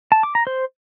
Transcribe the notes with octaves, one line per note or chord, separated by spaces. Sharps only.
A5
D6
A#5
C5